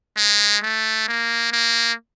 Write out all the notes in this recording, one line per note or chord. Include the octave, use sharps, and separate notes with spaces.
G#3
A3
A#3
A#3